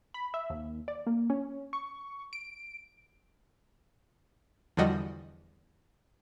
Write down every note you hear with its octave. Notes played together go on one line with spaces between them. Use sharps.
B5
E5
D#2
D5
A#3
C#4
C#6
D7
E2 D3 F3 G3 F#4 D#5